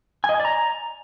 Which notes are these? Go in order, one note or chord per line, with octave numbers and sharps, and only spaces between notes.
G#5
D#5
G#5
D5
A#5